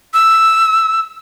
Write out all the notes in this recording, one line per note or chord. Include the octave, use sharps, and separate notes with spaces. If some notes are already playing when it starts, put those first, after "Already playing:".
E6